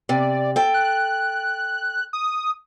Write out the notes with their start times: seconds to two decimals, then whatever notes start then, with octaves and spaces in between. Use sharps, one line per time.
0.09 C3 D5
0.56 A4 G5
0.74 F#6
2.13 D#6